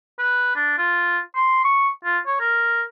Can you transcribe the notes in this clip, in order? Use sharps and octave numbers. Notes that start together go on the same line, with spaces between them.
B4
D4
F4
C6
C#6
F4
C#5
A#4